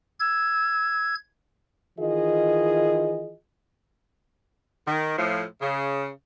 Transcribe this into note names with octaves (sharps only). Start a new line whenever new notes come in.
E6 G#6
D#3 E3 F4 G#4 D#5
D#3
A2 F3
C#3